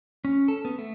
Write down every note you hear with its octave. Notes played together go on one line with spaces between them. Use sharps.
C#4
A4
B3
A3